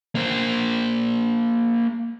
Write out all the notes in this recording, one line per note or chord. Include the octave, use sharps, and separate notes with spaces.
A#3 C5